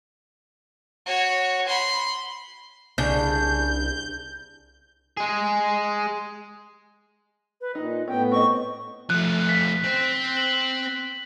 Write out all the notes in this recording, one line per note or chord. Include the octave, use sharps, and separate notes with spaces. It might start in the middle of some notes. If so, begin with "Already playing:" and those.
F#4 C#5
B5 C6
C2 C#3 D4 G6
G#3 G#4
B4
A#2 D#4 D#5
A2 B3 C#4 G5
C4 D#5 C#6
F3 A3 F#6
B6
C4 C5
F#7